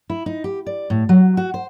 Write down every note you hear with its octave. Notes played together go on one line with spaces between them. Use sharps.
E4
D#4
G4
D5
A2
F#3
F#4
C5